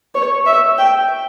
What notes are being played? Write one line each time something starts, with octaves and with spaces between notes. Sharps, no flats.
C#5
E5
G5